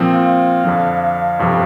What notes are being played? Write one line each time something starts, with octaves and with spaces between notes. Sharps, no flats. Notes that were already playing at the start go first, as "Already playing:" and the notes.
Already playing: A#2 F3 C4
F5
F2 D3 F3
F5
G1 F2 C3 F3